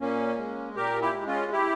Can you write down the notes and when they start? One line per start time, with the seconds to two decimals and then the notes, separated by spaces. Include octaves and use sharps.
0.01 A#2 A#3 C#4
0.38 G#3
0.76 A#2 G4 A#4
1.01 E4 G4
1.15 G#3
1.27 C#4 F4
1.52 E4 G4